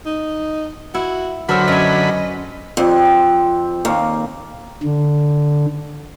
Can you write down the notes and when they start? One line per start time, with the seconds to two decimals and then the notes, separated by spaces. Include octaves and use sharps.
0.06 D#4
0.94 E4 F#4
1.49 D3 F#3 F#4 A#4 C5 E5 B5
1.68 F#2 D#5 G#5
2.77 F2 C4 G4
3.85 D#2 A#3 F5
4.83 D3